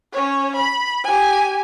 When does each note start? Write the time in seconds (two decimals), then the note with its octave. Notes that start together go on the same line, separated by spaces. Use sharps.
0.13 C#4 C#5
0.56 B5
1.04 G4 G#5